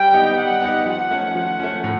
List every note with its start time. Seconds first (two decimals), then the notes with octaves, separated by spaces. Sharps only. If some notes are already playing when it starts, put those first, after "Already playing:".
Already playing: G3 G5
0.13 B3 D#4 G4
0.38 G3 F#5
0.62 B3 D#4 G4
0.86 F3 F#5
1.11 A3 C#4
1.35 F3 F#5
1.60 A3 C#4
1.84 A2